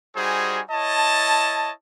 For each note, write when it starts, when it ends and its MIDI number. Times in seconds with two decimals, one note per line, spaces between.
0.16 0.60 55
0.16 0.60 63
0.16 0.60 66
0.16 0.60 68
0.16 0.60 72
0.16 0.60 80
0.70 1.71 64
0.70 1.71 73
0.70 1.71 75
0.70 1.71 81